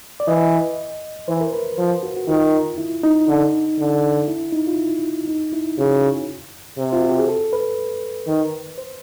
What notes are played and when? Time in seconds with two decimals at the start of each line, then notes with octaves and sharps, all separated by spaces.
0.20 D5
0.28 E3 D#5
1.28 E3 C5
1.41 A#4
1.53 B4
1.78 F3 C5
2.03 F#4
2.17 F#4
2.28 D#3 F4
2.78 E4
3.03 D#4
3.28 D3
3.78 D3
4.28 E4
4.53 D#4
4.67 F4
4.77 E4
5.28 D#4
5.53 E4
5.78 C#3 F#4
6.77 C3
6.93 F4
7.01 F#4
7.10 G4
7.18 G#4
7.28 A4
7.53 B4
8.27 D#3
8.78 C5